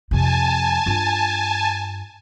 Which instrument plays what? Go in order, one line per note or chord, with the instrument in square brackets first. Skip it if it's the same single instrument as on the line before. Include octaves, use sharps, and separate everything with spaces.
[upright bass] F2 C3 [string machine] G#5 A5
[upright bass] G2 F4